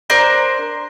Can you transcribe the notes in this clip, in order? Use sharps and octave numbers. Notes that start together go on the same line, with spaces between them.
D4 A#4 C5